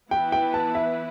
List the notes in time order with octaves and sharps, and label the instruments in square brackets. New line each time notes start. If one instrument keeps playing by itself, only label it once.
[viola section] E3 B3 E4 B4 [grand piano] G5
[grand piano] G5
A5
E5